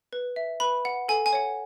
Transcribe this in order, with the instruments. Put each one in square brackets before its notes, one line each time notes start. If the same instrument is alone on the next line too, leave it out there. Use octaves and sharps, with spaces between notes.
[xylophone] B4
E5
B4 B5
F#5
A4 G#5
G#5
C#5 F#5